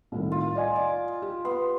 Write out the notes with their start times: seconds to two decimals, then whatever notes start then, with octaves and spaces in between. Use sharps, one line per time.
0.12 C2 A2 D#3
0.32 F4
0.55 D5 D#5 G#5
0.76 D6
1.22 G4
1.45 B3 C6